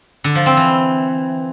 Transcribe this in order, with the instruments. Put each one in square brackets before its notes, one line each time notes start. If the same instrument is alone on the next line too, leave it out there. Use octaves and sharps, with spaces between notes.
[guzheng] D3
F3
C4
E3